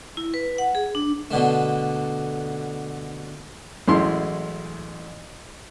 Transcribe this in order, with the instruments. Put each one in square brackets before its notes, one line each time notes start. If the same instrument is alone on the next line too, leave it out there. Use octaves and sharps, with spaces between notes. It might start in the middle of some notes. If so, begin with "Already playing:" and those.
[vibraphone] E4
B4
F#5
G#4
D4
[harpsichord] B2 D3 A3
[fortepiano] A1 F#2 G#3 E4 C6